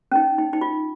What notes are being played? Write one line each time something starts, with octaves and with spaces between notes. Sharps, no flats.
C#4
D#4
D#4
D#4
F4